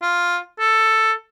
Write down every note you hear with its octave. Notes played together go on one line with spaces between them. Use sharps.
F4
A4